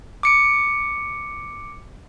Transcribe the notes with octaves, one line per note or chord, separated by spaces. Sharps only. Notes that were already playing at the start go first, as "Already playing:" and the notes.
D6 C#7 D7